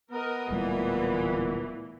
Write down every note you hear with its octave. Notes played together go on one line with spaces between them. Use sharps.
B3 A#4 D#5
D1 A#2 E3 G3 A3